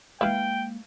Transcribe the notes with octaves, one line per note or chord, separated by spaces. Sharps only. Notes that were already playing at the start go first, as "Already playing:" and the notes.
G#3 A#3 E4 B4 F5 G5